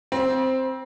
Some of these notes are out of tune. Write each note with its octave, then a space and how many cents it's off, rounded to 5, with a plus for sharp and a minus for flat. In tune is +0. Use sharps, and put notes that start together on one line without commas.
C4 +0 B5 -45